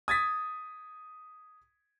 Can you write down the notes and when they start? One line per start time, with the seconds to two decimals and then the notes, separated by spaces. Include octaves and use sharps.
0.08 D#6 G#6 A6 B6